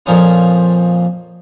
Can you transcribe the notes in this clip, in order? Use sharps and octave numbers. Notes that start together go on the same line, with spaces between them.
F2 A#2 F3 C4 C#4 D#4